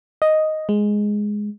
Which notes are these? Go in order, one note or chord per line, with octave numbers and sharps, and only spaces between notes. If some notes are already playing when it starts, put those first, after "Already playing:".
D#5
G#3